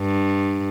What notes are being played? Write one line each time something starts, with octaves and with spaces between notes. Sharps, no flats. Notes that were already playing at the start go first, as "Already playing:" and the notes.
Already playing: G2